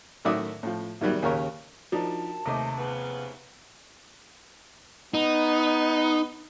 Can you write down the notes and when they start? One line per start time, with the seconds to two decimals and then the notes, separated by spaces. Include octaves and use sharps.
0.25 A2 D#3 F#3 D5 E5 D#6
0.63 A2 F3
1.01 E2 D#3 F#3 G3
1.22 D#2 C#3 A#4 C#5
1.92 F3 D4 D#4 F#4 A#4 A5
2.45 D#2 C3 A3 C5 D#5 A#5 D6
2.76 C#3 F3 B3
5.14 B3 D#4